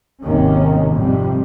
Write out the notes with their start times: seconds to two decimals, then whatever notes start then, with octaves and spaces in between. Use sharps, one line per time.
0.22 G#1 D#2 C3 D#3 C#4
0.93 F2 G#2 C3 G3